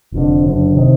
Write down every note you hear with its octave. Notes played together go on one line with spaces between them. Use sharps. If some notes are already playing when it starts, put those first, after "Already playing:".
F1 F2 D3
F#1 F#2 D3
C3 D#3